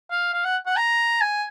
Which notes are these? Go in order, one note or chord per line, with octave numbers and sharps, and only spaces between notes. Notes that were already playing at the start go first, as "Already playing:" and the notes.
F5
F5
F#5
F#5
A#5
G#5